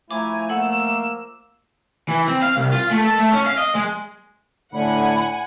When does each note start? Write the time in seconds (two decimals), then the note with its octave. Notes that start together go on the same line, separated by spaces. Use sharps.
0.11 F3 A3 E4 G#5 A#5 D6
0.49 A#3 A4 F#5 E6
2.08 E3
2.28 C4
2.42 F5
2.57 C2
2.72 F4
2.91 A3
3.04 A4
3.18 A3
3.33 C#4
3.46 F5
3.58 D#5
3.75 G#3
4.73 A2 D3 F#5 G#5 B5